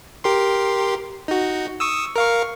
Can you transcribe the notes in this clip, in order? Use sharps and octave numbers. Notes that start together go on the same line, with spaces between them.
G4 A#4 C6
D#4 F#4
C#6 D#6 E6
A#4 F5 C#6